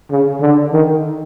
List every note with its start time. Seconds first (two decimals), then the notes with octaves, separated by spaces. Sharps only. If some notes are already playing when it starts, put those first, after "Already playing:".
0.11 C#3
0.41 D3
0.73 D#3